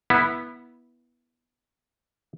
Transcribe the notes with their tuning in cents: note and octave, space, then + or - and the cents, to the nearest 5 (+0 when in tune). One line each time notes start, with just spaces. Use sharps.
B3 -15 E4 -5